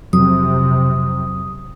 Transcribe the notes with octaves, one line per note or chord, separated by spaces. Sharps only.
F2 C3 F#3 D#6